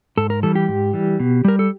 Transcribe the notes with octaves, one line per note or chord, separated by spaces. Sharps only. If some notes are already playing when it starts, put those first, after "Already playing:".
G#2 A4
A#4
E3 G3 A4
G4
G#2
E3 G3
B2
G3 A#4
A4